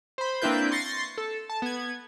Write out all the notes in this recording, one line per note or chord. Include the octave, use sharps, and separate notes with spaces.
C5 B5
A#3 C4 D4 E4 B4 G6
C6 C#6 A6 A#6 C7
A4
A5
B3 G#6